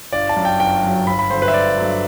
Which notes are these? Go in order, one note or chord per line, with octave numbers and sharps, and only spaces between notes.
G1 D5
A5
F#2 F#3
G5
G1 G5
F#2 F#3
G1 B5
B5
G2 D3 F#3 C5
B4
E5
G1 D5
G2 D3 F#3